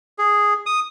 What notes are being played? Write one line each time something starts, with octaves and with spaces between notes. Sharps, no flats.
G#4
D#6